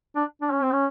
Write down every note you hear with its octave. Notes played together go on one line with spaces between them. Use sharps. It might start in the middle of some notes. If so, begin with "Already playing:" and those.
D4
D4
C#4
C4
C#4